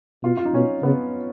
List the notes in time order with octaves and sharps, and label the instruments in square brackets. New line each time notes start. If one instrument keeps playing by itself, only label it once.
[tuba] B2 [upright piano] F4
[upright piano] F4
D#4
[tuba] B2 [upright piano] C#4
[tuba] C#3 [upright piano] B3